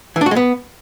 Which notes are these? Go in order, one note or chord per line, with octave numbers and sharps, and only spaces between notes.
E3
D4
F#4
G#3
B3